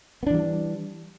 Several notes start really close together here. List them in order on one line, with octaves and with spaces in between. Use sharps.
B3 D4 E3 G3